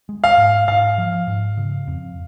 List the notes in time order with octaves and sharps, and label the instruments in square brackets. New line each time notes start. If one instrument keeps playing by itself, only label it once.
[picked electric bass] G#3
[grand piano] F5
[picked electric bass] G#2
[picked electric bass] G#2 [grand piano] F5
[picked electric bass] F3
G#2
C#3
F2